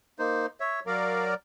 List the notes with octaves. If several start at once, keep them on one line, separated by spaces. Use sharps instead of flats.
A#3 D#4 C5
C#5 E5
F#3 A#4 D5 F5